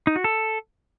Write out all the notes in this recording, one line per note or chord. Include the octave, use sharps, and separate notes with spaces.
D#4
F#4
A4